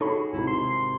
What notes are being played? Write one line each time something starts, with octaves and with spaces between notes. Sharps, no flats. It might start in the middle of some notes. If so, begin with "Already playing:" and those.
D#4 F#4 G#4 A4 C#5 B5
G#1 C3 E4
C6